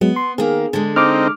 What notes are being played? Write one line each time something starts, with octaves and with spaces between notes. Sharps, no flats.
F#3 G#3 B3
C6
D#3 A#3 G#4
D3 G#3
C4 D#4 D6 F6